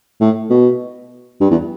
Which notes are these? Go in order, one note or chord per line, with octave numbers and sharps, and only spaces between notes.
A2
B2
G2
E2